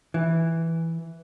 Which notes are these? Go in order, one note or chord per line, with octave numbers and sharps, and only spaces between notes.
E3